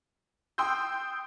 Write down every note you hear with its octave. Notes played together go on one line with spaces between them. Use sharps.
G5 C6 D#6 E6 G6